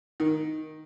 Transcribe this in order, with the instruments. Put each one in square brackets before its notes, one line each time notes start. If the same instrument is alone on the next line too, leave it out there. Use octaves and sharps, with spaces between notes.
[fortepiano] D#3